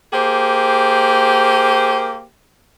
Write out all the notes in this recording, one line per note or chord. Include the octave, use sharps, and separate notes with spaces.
A#3 G4 G#4 C5